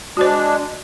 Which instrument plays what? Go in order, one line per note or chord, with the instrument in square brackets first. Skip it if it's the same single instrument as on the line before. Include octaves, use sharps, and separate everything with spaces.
[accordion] G#3 D4 [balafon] F#4 C5